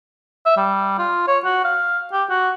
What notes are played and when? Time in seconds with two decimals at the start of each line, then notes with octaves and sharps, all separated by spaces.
0.46 E5
0.57 G3
0.99 F4
1.27 C#5
1.45 F#4
1.64 F5
2.13 G4
2.30 F#4